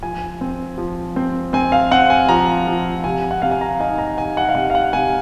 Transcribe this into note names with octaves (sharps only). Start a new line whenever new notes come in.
F3 G#5
C4
F3
C4
C4 G#5
F5
C4 F#5
G#5
F3 A#5
F3
C3 G#5
F#5
C3 F5
G#5
A#5
D#4 G#5
A#5
D#4 G#5
F#5
F5
C3 F#5
F5
F#5
C3 G#5